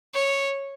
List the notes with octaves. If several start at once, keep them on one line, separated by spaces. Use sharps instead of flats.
C#5